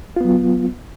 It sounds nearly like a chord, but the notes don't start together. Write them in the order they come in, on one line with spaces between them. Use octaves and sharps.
F4 B3 F#3